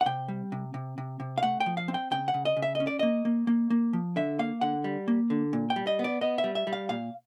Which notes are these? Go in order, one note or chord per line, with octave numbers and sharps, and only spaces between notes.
F#5
C3 G5
G3
C3
C3
C3
C3
F5
A3 F#5
G5
F3
F5
C4
G5
C#3 G5
F#5
C#3
D#5
C#3
E5
D#5
C#4
D5
A#3 D#5
A#3
A#3
A#3
F3
D3 E5
A#3 F5
D3 F#5
G3
A#3
D3
A#2
G5
G3
D#5
B3
D5
B3 D#5
E5
G3
E5
G3
F5
A#2 F5